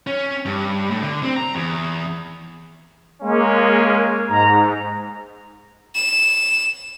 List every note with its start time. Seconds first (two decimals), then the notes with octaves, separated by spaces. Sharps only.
0.07 C#4
0.45 G2
0.90 A2
1.02 D3
1.23 C4
1.37 A#5
1.55 E2
3.21 G#3 A#3 C#4
4.28 G#2 A#5
5.95 E7